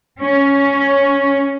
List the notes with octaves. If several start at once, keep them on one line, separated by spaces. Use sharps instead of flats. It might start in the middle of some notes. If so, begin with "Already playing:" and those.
C#4